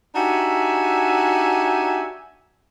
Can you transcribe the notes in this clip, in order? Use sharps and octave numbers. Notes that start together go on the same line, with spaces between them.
D4 D#4 F#4 G4 E5 G#5